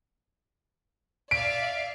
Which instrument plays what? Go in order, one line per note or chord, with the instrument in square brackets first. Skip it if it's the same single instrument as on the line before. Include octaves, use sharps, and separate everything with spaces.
[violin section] D5 E5 F5 [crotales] B6 [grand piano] D7